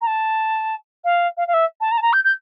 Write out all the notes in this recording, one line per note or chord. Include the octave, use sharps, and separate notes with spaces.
A#5
A5
F5
F5
F5
E5
A5
A#5
A5
A#5
G6
G6